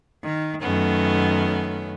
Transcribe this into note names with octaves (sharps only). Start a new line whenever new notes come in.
D#3
F#2 D#3 A3 B3 C#4